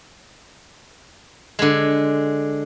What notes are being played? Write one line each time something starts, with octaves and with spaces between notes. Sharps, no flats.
D3 G#3